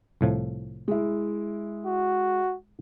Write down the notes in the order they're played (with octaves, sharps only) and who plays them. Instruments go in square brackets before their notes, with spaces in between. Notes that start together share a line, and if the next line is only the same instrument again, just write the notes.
[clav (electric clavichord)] C2 A2 F3
[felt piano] G#3 E4
[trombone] F#4